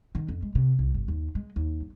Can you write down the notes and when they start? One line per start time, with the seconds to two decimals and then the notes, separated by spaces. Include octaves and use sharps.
0.15 D#3
0.28 F2
0.42 G#3
0.55 C3
0.79 C2
0.94 G1
1.08 D#2
1.35 G#3
1.56 D#2
1.81 G1